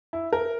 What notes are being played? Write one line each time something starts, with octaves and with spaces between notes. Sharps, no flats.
E4
A#4